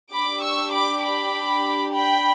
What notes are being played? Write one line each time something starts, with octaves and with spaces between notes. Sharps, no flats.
D4 G4 B5 D6
C#6 E6
B5 D6
B5 D6
G5 B5